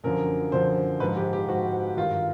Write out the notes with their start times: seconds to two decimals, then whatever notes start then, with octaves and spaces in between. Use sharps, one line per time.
0.04 F#2 D3 F3 A#4
0.51 F#2 D3 F3 C5
1.00 G#2 F3 B4
1.16 G4
1.33 G4
1.49 G#2 F3 F#4
1.97 G2 D#3 F4